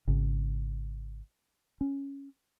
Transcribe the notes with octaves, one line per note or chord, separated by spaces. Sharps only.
G#1 C#3
C#4